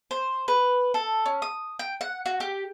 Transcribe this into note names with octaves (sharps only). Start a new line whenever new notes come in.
C5
B4
A4
C#4
D#6
G5
F#5
F#4
G4